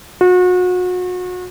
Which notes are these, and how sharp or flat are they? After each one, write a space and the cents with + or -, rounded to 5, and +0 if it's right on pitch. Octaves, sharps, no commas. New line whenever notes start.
F#4 -35